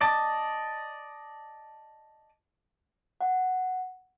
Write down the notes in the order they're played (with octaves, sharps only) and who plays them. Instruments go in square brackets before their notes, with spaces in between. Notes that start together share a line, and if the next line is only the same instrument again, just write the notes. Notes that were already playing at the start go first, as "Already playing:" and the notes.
[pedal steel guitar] D5 D#5 A5
[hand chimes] F#5